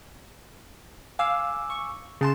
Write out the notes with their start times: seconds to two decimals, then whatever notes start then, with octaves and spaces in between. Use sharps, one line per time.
1.19 F5 G#5 D6 E6
1.70 C#6
2.21 C#3 G#4 G#5 A5 C6 E7